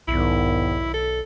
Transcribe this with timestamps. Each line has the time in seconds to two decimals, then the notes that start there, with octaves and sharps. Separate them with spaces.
0.08 B1 E2 G#2 D#3 E4
0.94 A4